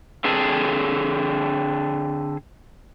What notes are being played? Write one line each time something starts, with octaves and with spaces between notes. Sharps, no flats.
D3 C4 G#4 A4